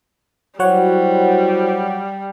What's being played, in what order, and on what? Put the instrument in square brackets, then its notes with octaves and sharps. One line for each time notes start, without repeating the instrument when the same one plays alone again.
[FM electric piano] F#3 C#5 F#5 [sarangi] G3 [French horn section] E4 F#4 C5